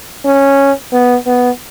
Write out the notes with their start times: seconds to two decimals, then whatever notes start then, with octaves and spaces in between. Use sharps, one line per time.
0.25 C#4
0.93 B3
1.26 B3